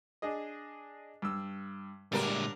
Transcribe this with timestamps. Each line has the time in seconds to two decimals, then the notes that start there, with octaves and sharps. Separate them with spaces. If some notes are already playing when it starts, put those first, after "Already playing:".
0.22 D4 G#4 D#5
1.22 G2 E6
2.12 A#2 D3 G3 G#3 D4 A#4